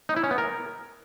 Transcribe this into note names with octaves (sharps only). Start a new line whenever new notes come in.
D#4
E4
C#4
B3
A#4